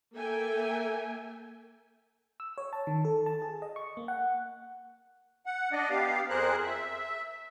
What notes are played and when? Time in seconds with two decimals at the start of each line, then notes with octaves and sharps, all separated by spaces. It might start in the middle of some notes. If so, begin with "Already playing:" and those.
0.14 A#3 A4 E5 G5 G#5
2.40 E6
2.58 C#5
2.73 A5
2.87 D#3
3.05 A4
3.26 A5
3.42 G#4
3.62 D#5
3.76 C#6
3.97 A#3
4.08 F#5
5.46 F#5
5.72 D4 D5 D#5
5.90 B3 G4 F5
6.29 F2 G#4 A#4 C5 F#6
6.64 E5